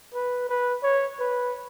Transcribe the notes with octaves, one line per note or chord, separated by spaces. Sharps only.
B4
B4
C#5
B4